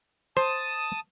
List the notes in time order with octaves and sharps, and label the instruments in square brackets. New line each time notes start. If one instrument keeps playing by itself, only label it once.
[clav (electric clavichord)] C5 [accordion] A5 D#6